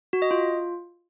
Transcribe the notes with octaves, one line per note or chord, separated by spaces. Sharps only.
F#4
D#5
F4